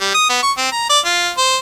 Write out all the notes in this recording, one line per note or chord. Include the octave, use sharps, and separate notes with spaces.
G3
D#6
B3
C#6
C4
A#5
D5
F4
C5